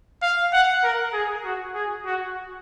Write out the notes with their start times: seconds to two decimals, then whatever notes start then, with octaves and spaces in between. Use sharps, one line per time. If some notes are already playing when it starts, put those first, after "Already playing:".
0.23 F5
0.53 F#5
0.84 A#4
1.13 G#4
1.45 F#4
1.75 G#4
2.06 F#4